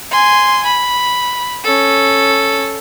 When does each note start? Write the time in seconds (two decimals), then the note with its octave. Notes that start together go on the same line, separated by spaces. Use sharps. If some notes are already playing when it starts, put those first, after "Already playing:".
0.11 G#5 C6
0.66 B5
1.64 C#4 A4